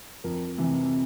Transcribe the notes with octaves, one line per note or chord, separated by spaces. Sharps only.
F2 A#4
C3 E3